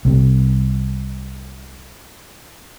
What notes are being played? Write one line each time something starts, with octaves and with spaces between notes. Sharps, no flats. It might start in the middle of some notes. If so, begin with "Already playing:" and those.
C2 C3